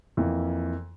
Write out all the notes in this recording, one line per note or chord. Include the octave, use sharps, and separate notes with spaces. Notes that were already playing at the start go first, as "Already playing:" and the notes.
F2 E3 A#3 E4